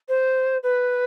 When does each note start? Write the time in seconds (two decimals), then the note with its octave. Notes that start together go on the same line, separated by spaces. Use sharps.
0.08 C5
0.63 B4